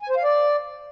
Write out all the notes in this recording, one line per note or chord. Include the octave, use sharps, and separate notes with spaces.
G#5
C5
F5
D5